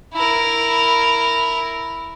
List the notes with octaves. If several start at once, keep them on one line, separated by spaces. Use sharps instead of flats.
E4 A#4